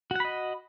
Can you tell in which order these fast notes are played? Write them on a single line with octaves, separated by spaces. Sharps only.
F#4 F#5 B5 D#5